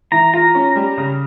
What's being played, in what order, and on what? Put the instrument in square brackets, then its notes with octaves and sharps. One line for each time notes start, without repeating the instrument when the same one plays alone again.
[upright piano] E3 [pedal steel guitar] A#5
[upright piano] F4 [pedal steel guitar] A#5
[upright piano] C#4
G3
C#3